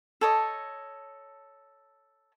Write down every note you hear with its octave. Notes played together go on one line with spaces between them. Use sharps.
A4 C#5 D#5